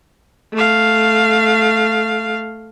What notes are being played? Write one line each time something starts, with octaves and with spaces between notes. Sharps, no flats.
A3 F5